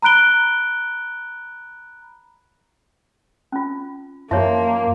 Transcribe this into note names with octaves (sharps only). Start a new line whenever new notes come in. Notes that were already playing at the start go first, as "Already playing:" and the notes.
A#5 B5 F#6 D7 G7
C#4 F4
F#2 F3 A#3 G4 C#5 E5